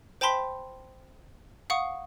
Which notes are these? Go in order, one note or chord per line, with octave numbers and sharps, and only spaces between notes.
C5 G5 A5 B5 C6 B6
F5 F#5 C#6 D#6